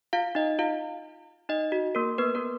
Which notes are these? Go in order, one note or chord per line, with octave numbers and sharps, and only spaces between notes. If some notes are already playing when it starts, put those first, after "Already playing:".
F4 F5
D#4 D#5
F4 F5
D#4 D#5
F#4
A#3 A#4
B3 B4
A#3 A#4